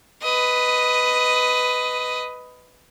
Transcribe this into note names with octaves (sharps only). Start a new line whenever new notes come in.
B4 D#5